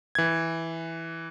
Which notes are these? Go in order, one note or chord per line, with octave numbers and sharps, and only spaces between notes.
E3 G#6